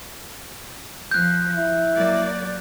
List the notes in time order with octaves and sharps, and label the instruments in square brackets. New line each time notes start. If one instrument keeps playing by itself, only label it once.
[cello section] F3 [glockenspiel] F#6 G6
[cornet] E4
[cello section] F#3 A#3 D5